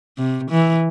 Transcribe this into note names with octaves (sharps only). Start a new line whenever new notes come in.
C3
E3